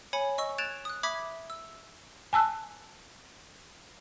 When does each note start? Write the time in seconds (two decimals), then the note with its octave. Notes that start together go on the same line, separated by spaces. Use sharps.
0.13 C#5 G#5 B5 C#7
0.38 D#5 C#6 E6
0.58 F#6 G#6 A6 D7 E7 F7
0.85 D#6 F#6
1.03 E5 B5 D6 D#6 G#6 B6
1.50 E6
2.33 G#5 A5 E6 F#6